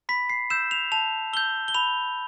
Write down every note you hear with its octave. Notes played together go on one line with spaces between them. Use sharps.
B5 B6
C7
E6 G6 E7
F7
A5 F7
E6 G6 G7
G7
B5 F7